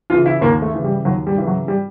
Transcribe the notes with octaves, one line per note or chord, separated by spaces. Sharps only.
C#3 E3 F4
E4
D#2 A#3
A3
C#3 E3
G3
D#2 F#3
G3
C#3 E3
F#3
G3